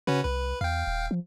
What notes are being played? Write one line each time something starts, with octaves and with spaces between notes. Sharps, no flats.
C#3 C#4 F#4 B4
C2 B4
E2 F5 G5
D#1
F3